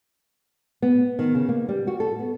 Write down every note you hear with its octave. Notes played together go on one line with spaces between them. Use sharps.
B3
D#3
C#3
A#3
G3
F#4
A4
B3